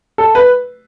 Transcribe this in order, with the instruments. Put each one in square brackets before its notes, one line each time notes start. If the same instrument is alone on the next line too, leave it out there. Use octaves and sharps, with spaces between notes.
[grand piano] A4
B4